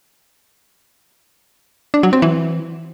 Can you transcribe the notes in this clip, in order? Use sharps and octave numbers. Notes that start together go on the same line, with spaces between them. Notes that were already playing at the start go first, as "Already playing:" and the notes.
D4
F#3
C4
E3